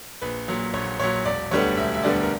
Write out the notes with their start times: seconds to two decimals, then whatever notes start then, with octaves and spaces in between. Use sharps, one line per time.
0.22 A#1 B4
0.48 A#2 F#3
0.73 A#1 C#5
1.00 A#2 F#3 C#5
1.25 E1 D5
1.51 D2 D3 G3 B3 C#5
1.77 E1 E5
1.94 E5
2.03 D2 D3 G3 B3 D5
2.21 A#4